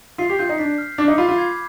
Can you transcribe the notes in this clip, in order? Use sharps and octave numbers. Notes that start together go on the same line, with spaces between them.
F4 C7
G4
F4 G6
D#4
D4 B6
F6
D4 D6
D#4
F4 B5
F4
G#6